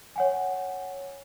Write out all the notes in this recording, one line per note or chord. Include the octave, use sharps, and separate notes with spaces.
C#5 F#5 G#5